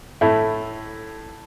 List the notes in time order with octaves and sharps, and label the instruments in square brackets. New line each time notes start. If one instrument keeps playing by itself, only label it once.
[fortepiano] A2 A3 E4